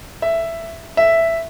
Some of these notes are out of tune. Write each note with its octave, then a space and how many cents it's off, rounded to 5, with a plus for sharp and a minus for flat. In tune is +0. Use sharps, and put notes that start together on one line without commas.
E5 +10
E5 +5